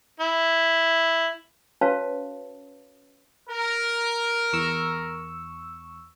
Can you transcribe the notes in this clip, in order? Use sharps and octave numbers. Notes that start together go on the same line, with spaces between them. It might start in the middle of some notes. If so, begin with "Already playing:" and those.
E4
C#4 F#4 B4 C#5 F5 A5
A#4
E2 C#6 E6